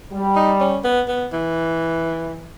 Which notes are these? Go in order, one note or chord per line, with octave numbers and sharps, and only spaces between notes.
G3
D#4
C#4
B3
B3
E3